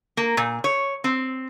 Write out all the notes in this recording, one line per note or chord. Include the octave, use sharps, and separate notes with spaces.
A#3
A#2
C#5
C4